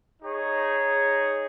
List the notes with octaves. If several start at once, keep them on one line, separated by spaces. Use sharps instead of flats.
D#4 G#4 C#5